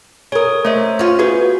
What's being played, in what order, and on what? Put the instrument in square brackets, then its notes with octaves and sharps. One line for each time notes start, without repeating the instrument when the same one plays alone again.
[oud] G#4 A#4 [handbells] C#5 D#6
[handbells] A3 C5 E5 [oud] C#4 D#5
[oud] C#4 F4
[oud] B3 G#4 B4 [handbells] F#4